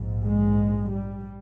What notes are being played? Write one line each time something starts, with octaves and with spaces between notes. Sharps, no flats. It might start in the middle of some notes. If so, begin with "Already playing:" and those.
Already playing: A#1 G#2
G#3
G3